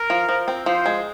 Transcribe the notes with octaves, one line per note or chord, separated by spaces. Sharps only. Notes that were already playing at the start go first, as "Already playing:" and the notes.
Already playing: A#4
F3
F3
C4
F3 C5
G#3